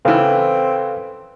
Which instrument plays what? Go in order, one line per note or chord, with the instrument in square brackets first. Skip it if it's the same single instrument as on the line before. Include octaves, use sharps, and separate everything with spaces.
[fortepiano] C#3 E3 [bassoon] C4 [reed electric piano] A4 B4 F5